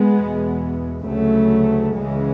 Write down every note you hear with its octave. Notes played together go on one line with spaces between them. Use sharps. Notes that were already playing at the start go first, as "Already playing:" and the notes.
Already playing: G#3 B3
E2 B2
D2 C#3 F#3 A3
C#2 C#3 E3 G#3